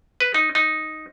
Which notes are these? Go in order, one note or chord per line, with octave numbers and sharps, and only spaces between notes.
B4
D#4
D#4